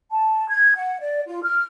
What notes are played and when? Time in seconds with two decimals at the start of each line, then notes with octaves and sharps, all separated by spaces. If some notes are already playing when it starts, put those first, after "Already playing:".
0.12 A5
0.48 G#6
0.75 F#5
1.00 D5
1.26 F4
1.43 F6